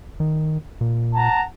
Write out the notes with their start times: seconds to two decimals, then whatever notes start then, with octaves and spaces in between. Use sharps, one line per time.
0.20 D#3
0.81 A#2
1.14 F#5 A5 A#5